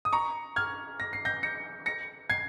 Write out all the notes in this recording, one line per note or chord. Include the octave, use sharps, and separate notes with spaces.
D#6
A#5 C#6
F6 G#6
A#6
C7
G6 A#6
A#6 C#7
A#6 C#7
G#6 C7